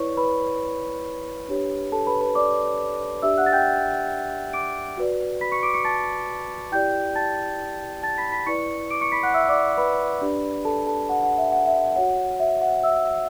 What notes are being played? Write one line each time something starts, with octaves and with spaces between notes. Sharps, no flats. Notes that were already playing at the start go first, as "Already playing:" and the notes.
Already playing: E4 B4 C#5 D5 C#6
B4 B5
D4 G4 C#5
A4 A5
B4 B5
B4 B5
D5 D6
D4 G4 D5 E5 E6
F#5 F#6
A6
G5 G6
D6 D7
F#4 B4 D5
B5 B6
C#6 C#7
D6 D7
C#6 C#7
A5 A6
E4 G4 D5 G5 G6
A5 A6
A5 A6
B5 B6
B5 B6
E4 B4 D5 C#6 C#7
D6 D7
C#6 C#7
B5 B6
F#5 F#6
E5 E6
D5 D6
B4 B5
D4 G4 D5
A4 A5
A4 A5
F#5
F#5
E5
F#5
E5
F#4 C#5 F#5
F#5
E5
F#5
E5 E6